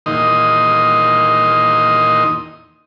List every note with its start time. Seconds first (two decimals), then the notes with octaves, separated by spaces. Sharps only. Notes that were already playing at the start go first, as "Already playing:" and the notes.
0.06 E2 A#2 D#3 D#4 D#5 C6